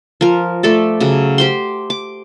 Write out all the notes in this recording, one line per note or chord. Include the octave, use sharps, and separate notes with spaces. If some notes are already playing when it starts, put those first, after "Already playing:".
F3 A#4
F3 A3 A4 D5
C#3 F#3
G4 C5 C6
D6